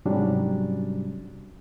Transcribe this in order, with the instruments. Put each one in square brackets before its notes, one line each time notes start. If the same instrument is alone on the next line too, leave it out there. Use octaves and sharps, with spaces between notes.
[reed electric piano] G#2 C3 F#3 G3 C#4 D4